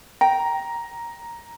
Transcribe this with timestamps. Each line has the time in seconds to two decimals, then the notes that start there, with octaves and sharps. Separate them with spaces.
0.21 G5 A#5